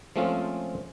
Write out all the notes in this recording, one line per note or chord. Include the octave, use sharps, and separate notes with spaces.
F3 G#3 A3 C4 C#4 F4